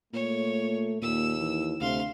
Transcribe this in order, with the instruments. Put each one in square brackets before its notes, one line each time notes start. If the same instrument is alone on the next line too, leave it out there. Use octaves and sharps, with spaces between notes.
[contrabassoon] A#2 [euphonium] A3 [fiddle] C#5
[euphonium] D#2 [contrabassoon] A#2 [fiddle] E6
[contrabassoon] E3
[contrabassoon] D2 [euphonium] C3 [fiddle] F5 C6